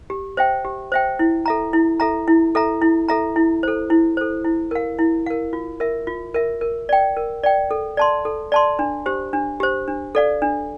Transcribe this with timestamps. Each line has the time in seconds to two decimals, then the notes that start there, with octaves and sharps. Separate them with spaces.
0.10 G4
0.37 C5 E5 G5
0.65 G4
0.92 C5 E5 G5
1.19 E4
1.46 A4 E5 A#5
1.73 E4
2.00 A4 E5 A#5
2.28 E4
2.55 A4 E5 A#5
2.82 E4
3.08 A4 E5 A#5
3.36 E4
3.63 A4 C5
3.90 E4
4.17 A4 C5
4.44 E4
4.71 A#4 F5
4.99 E4
5.26 A#4 F5
5.53 F4
5.80 A#4 E5
6.07 F4
6.35 A#4 E5
6.61 A#4
6.89 D5 G5
7.17 A#4
7.43 D5 G5
7.71 A4
7.97 D5 A5 C6
8.25 A4
8.52 D5 A5 C6
8.79 D4
9.06 G4 C5
9.33 D4
9.60 G4 C5
9.88 D4
10.15 A4 D5 F5
10.42 D4